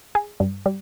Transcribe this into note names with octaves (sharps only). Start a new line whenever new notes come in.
G#4
G2
G3